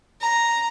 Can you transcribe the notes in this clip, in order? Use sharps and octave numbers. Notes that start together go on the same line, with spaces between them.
A#5